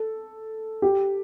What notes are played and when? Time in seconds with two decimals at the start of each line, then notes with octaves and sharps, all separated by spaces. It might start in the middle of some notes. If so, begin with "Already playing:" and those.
Already playing: A4
0.82 G4